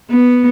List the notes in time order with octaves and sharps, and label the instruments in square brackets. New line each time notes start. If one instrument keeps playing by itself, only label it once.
[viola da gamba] B3